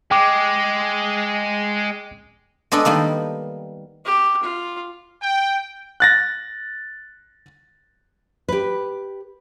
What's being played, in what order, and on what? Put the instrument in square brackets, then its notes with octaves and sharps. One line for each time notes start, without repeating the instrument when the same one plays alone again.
[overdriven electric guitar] G#3 [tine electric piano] G5 D6
[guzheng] G#3 B3 D4 G#4 A4
D#3 G3 A#3 B3
[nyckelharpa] G4
F4
[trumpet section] G5
[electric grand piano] F#6 A6 A#6
[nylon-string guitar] G4 B4